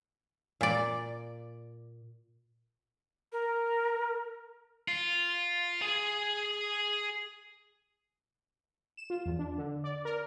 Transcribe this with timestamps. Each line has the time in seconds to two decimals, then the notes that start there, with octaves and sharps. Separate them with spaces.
0.61 A#2 D5
3.32 A#4
4.88 F4
5.82 G#4 G#5
8.97 E7
9.10 F4
9.26 E2
9.39 D4
9.58 D3
9.84 D5
10.05 A#4